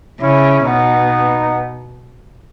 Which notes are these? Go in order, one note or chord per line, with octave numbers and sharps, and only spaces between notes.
C#3 C#4 E4
B2 B3 D#4